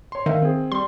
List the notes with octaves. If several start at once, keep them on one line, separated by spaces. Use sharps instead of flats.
C#5 C6
D#3 E5 F5
C4 G#4
G3 C6